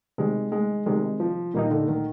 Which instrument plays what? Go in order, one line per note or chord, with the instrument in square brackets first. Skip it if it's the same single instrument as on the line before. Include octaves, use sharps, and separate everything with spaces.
[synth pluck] C3 D#3 G3 [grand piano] G#3
[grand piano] G#3
[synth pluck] C3 D#3 G3 [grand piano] G#3
[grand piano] F3
[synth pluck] A#2 G3 A#3 D#4 [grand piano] D#3
[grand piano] D3
D#3